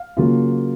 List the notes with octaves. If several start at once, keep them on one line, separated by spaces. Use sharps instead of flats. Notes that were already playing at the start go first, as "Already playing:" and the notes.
Already playing: F5
C#3 F#3 A#3 F4